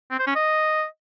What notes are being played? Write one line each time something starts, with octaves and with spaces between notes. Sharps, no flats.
C4
C5
C#4
D#5